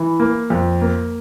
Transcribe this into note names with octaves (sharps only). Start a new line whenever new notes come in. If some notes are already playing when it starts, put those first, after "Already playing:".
Already playing: E3
A#3
F2
A#3